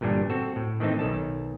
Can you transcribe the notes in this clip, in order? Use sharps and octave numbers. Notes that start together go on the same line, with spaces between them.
G1 A#2 E3 G3 D4
C4 F#4 A4
A2
D#3 E3 A3 C4 D#4
B1 D#3 A4 A5